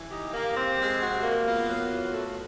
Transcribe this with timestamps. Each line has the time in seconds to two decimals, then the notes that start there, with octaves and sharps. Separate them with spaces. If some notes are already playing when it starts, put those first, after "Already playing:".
Already playing: E3
0.11 D#4 G4
0.33 A#3
0.56 C4
0.78 G#3
1.00 C3 F#4
1.23 A#3
1.46 B3 F4
1.68 F#3
1.91 E3
2.13 A3